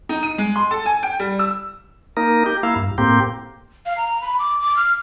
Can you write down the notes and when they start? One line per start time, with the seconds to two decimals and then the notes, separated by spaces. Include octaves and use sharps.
0.09 D#4
0.23 D#7
0.38 G#3
0.56 C6
0.71 A4
0.86 G#5
1.03 G5
1.19 G3
1.39 E6
2.17 A#3 D#4 A#4
2.46 G4
2.63 A#3 E4 F5
2.76 G2
2.98 A2 A#3 C4 G4
3.86 F5
3.97 A#5
4.21 B5
4.39 D6
4.60 D6
4.77 F6